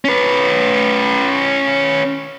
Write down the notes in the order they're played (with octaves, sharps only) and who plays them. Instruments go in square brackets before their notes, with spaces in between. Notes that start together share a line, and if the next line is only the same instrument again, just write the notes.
[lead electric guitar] C#4 B4